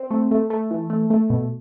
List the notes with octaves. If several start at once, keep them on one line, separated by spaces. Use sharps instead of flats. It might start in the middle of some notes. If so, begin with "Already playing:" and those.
Already playing: C4
A3
A3
A3
E3
A3
A3
B2